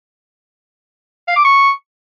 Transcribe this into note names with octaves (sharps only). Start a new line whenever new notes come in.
F5
D6
C#6